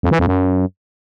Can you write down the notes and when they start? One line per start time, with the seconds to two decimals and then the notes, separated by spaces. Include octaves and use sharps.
0.03 F2
0.11 E3
0.19 F2
0.27 F#2